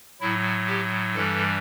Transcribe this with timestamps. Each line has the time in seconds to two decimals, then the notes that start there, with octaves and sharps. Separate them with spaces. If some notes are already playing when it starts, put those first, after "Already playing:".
0.21 A2 F#3 E4
0.67 G4
1.14 G2 E3 G3 A4